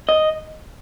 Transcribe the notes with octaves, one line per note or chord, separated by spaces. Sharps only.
D#5